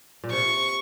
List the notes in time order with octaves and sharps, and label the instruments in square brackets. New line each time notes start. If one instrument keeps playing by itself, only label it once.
[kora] A#2
[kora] C3 [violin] C#6